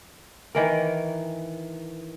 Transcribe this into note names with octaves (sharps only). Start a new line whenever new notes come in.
D#3 E3 A#4